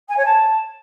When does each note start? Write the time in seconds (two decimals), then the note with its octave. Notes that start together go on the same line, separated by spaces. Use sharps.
0.08 G#5
0.16 C#5
0.25 A5